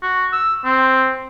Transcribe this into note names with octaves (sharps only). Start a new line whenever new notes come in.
F#4
E6
C4